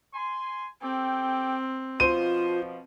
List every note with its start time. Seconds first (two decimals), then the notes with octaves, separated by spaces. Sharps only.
0.14 G#5 C6
0.82 C4 G4 A4 G5
2.00 B2 F3 F4 C5 D#7